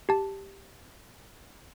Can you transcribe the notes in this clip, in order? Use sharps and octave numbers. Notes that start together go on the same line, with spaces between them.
G4 A5